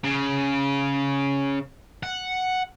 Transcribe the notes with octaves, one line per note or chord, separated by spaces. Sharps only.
C#3
F#5